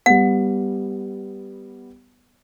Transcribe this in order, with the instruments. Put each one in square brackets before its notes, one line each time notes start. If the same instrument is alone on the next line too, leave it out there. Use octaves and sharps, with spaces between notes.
[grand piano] G3 B3 [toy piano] F#5